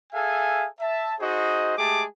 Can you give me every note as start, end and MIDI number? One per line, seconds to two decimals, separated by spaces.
0.13 0.66 68
0.13 0.66 69
0.13 0.66 76
0.13 0.66 77
0.13 0.66 80
0.79 1.13 76
0.79 1.13 81
1.20 1.73 63
1.20 1.73 66
1.20 1.73 68
1.20 1.73 72
1.20 1.73 75
1.77 2.03 56
1.77 2.03 57
1.77 2.03 67
1.77 2.03 68
1.77 2.03 81
1.77 2.03 86